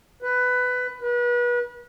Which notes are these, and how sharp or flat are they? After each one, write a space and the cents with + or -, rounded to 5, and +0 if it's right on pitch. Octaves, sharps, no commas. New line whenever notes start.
B4 +15
B4 -35